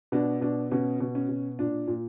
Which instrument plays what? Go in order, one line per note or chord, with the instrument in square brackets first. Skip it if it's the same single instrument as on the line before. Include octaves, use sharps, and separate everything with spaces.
[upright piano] B2 D4
B2 D4
B2 C#4
B2
C#4
B2
A#2 D4
A#2